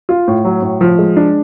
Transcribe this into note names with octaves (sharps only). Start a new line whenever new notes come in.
F4
A2
F#3
A2
F3
G#3
D4